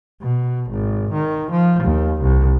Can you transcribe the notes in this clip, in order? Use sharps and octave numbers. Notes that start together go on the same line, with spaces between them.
B2
G#1
D#3
F3
D#2
C2